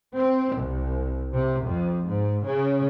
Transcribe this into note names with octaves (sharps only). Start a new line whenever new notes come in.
C4
C2
C3
F2
G#2
C#3